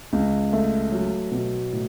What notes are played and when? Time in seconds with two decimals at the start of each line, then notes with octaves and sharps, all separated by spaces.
0.13 C#2
0.53 A3
0.92 F#3
1.31 B2
1.72 A2